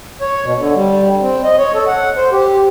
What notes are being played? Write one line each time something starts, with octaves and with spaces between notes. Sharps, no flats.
C#5
B2
D3
G3
C4
D#5
C#5
A4
F#5
C5
G4